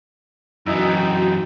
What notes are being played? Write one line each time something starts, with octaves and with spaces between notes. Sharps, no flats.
F#2 E3 D#4 E4 F#4 D#5 G5